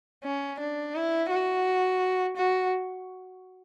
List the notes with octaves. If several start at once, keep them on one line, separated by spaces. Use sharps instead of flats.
C#4
D4
E4
F#4
F#4